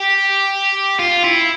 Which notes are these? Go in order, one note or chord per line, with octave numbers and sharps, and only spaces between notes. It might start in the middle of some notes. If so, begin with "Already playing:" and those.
Already playing: G4
F4
E4